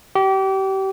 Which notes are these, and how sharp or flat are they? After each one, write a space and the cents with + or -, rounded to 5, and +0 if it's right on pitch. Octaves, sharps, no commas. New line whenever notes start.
G4 -30